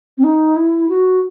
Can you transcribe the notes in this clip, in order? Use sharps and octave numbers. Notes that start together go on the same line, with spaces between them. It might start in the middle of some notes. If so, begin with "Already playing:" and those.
C4
D#4
E4
F#4